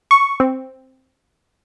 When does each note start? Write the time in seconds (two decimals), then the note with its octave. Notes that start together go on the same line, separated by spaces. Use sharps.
0.11 C#6
0.40 C4